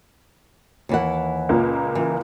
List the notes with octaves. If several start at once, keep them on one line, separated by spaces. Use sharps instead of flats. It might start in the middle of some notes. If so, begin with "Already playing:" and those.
D#2 E3 F#5
C#2 A#2 A#3
E3